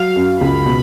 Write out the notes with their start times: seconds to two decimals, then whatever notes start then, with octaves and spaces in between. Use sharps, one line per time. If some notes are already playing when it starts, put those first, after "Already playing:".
Already playing: F#3 F5
0.16 F#2
0.41 C#2 B5
0.66 B2